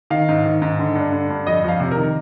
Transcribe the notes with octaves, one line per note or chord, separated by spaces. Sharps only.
D#3 F5
G#2
D#3
G#2
D3
G2
D3
G2
F2 D#5
F2 F5
C3
A#4
D#3